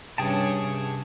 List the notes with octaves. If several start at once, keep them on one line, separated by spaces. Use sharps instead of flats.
G2 C3 C#4 G#4 C#5 G5 A5